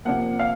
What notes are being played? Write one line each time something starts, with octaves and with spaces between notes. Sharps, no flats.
C3 F3 A#3 F#5
F5